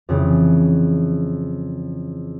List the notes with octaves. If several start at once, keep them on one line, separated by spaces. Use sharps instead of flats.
F2 C#3 E3